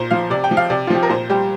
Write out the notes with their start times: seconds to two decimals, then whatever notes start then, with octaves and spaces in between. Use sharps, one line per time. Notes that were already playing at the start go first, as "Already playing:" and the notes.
Already playing: A#2 C5
0.11 F3 F5
0.30 C3 D5
0.44 G5
0.51 F3
0.57 F5
0.70 C3 D5
0.87 F4
0.90 F3 G4
1.03 A#4
1.10 A#2 C5
1.30 G3 G4